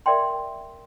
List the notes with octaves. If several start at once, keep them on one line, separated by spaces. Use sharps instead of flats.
A#4 D5 E5 G5 C6